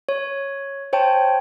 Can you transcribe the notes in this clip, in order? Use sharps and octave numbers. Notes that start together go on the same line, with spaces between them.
C#5
C5 C#5 G5 A5